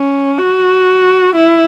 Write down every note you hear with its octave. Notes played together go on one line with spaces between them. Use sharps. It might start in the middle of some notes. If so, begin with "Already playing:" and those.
Already playing: C#4
F#4
E4